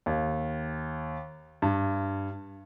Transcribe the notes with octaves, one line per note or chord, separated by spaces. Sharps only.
D#2
G2